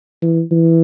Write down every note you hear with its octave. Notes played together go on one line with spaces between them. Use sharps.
E3
E3